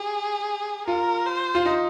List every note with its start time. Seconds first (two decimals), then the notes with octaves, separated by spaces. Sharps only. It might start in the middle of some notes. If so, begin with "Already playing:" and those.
Already playing: G4 G#4
0.87 F4 A#4
1.26 C5
1.55 F4
1.65 D#4